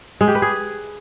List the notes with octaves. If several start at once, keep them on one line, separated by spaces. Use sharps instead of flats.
G#3
G4
B4
G#4